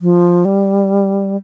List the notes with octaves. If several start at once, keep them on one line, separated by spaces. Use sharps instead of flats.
F3
G3